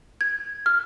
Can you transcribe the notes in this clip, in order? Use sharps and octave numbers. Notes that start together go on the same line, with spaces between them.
G#6
F6